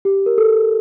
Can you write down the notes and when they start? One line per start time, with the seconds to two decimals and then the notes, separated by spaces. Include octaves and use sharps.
0.05 G4
0.26 A#4
0.38 A4